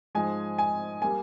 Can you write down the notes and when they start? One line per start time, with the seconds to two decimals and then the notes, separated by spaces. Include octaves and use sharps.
0.15 G#2 F3 G#3 G#5
0.58 G#5
1.02 G3 A#3 G#5